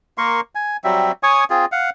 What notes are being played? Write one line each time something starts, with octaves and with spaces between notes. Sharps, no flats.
A#3 A#4 C6 C#6
G#5
F#3 G3 C4 E5
C#5 G#5 C#6 D#6
C4 F4 G#4
F5 F#5